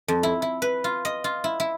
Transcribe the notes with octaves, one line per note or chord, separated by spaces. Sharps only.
F2
E4
E4
B4
F4
D#5
F4
E4
E4